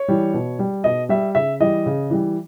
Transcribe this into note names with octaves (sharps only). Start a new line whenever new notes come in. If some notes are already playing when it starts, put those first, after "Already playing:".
Already playing: C#5
E3 G3
B2
G3
B2 D#5
G3 E5
C#3 E5
E3 G3 D#5
C#3
E3 G3